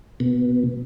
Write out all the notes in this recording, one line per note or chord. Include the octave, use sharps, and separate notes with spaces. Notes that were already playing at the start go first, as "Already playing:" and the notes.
B2